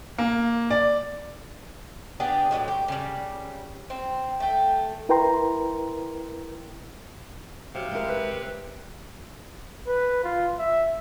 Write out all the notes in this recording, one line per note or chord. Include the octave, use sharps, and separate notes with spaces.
A#3
D5
B3 D4 G4 G#4
A2 C3 F#3 G#3
G4
C#3 G3
C4
A3 G5
E4 A#4 B4 G5 A#5 C6
C3 D#3 F#3 F5
G#3 E4 A#4
B4
B4
F4
E5